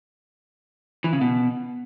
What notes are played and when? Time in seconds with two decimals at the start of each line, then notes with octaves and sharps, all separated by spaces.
1.04 E3
1.13 C#3
1.21 B2